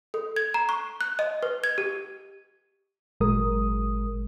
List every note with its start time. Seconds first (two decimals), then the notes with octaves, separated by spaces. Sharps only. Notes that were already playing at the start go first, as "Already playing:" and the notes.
0.14 A4
0.36 G#6
0.54 A#5
0.69 C#6
1.01 F#6
1.19 D#5
1.43 B4
1.64 G#6
1.78 G4
3.20 G#1 A#2 F#3 G#3 A#4 D#6